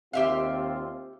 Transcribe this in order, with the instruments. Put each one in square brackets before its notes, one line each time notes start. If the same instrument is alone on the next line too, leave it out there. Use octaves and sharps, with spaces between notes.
[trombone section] D#2 C4 F4 [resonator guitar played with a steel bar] G4 E5 F5